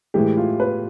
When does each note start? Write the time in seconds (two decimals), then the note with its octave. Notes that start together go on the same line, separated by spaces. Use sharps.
0.14 A2 E3 G#3 G4
0.37 F4
0.60 B4